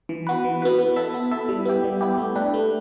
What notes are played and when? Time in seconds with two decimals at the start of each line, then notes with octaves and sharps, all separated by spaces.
0.09 E3
0.27 B3 F#4 B4
0.44 E3
0.62 B3 F#4 B4
0.79 B3
0.96 E4 A4 E5
1.14 B3
1.31 E4 A4 E5
1.49 G3
1.65 B3 E4 G4
1.84 G3
2.01 B3 E4 G4
2.18 A3
2.35 D4 G4 B4
2.54 A3